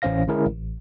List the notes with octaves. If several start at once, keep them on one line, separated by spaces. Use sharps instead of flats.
A1 E3 C#4 C5 F5 A#6
D3 G#3 C#4 E4 G#4 A#4
A1